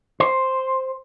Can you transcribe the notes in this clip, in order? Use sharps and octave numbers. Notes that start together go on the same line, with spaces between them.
C5